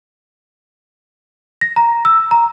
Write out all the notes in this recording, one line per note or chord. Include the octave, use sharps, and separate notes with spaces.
A#6
A#5
E6
A#5